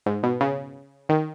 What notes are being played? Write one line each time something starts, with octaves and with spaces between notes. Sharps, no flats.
G#2
B2
C#3
D#3